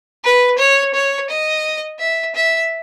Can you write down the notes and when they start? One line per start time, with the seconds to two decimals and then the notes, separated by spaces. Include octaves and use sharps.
0.24 B4
0.58 C#5
0.94 C#5
1.30 D#5
1.99 E5
2.35 E5